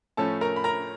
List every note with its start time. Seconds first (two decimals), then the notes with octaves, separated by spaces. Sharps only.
0.17 A2 F3 A3 C#4 A4 A5
0.41 A#4 A#5
0.56 B5
0.64 A#4 A#5